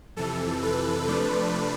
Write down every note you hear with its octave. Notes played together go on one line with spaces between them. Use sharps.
F2 C3 E3 A4
B4
C3 F3 A3 D4